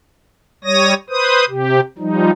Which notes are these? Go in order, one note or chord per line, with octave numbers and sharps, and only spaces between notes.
G3 C#5 D#6 A#6
B4 C5 D#6
C3 G4
F3 G3 D#4